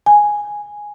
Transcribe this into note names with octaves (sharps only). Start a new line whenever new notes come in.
G#5